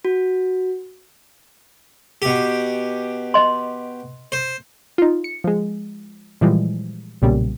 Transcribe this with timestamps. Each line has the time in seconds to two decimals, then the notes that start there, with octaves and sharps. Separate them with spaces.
0.05 F#4
2.22 B2 G4
3.34 D#5 C6
4.32 C5
4.98 D#4 F4
5.24 C#7
5.44 F3 G#3
6.41 A#2 E3 F3 G3 G#3
7.22 B1 A#2 C#3 G3